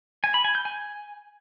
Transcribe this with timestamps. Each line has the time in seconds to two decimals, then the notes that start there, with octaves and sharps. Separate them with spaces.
0.24 G#5
0.34 B5
0.44 G#5
0.55 G6
0.65 G#5